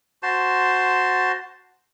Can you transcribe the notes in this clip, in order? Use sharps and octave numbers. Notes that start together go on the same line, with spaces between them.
F#4 C5 A5 C6